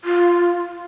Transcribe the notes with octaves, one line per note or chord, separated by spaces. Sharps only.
F4